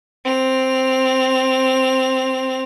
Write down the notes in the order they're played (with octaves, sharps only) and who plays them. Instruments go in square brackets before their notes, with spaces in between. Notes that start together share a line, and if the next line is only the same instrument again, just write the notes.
[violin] C4 F7